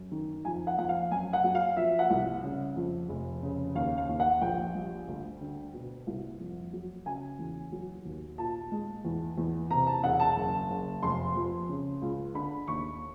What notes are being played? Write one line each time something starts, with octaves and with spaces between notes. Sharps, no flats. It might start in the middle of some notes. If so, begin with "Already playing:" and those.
Already playing: F#2
D#3
F2 G#5
F#5
F2 F#5
F5
F#2 G#5
F#5
F#3
F5
F3 E5
F#5
C2
C#3
F2
F1
C#3
D#2 F5
F5
D#2
F#5
A#1 G5
G3
D2
D3
B2
C2
F2
F#3
C#3 G#5
E2
F#3
D#2
A#2 A5
G#3
E2
E2
C3 A#5
A5
E1 F#5
A5
F#1
F#1
F1 C6
F2
C#3
C#2
D3 B5
D#2 C#6